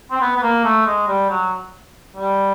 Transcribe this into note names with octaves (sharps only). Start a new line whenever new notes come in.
C4
B3
B3
A#3
A3
G#3
G3
F#3
G3